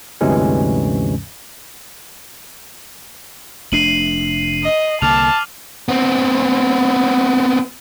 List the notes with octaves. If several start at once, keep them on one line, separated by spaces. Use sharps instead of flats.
D2 G2 C3 E3 G#3 C#4
F1 A3 D4 C7 D#7 F#7
D#5
C2 D3 A#3 A5 D6 F6 F7
B3 C4